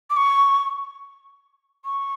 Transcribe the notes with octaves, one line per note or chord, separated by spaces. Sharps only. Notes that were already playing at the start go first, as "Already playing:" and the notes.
D6
C#6
C#6